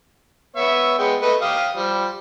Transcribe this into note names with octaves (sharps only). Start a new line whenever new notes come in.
B3 C#5 E5
G#3 B3 G5
A3 B4 D#5
G4 F5 D#6
F3 G3